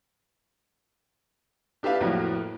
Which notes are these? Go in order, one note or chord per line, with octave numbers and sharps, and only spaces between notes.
D4 G4 B4 E5 F5
F2 A2 F#3 A#3